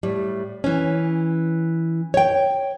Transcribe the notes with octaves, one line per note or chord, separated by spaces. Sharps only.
A2 G3
E3 C#4
C#5 G5